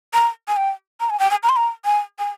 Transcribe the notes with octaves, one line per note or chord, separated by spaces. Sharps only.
A#5
G#5
G5
A#5
G#5
G5
G#5
A#5
C6
A#5
G#5
G#5